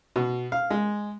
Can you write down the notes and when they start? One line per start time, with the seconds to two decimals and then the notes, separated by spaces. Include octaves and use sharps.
0.16 B2
0.52 F5
0.70 G#3